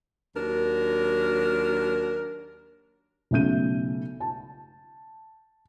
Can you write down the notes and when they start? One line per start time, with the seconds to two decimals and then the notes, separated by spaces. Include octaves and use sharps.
0.36 D#2 F#3 D4 A#4
3.31 B1 C#3 A3 G6 D#7
4.20 A5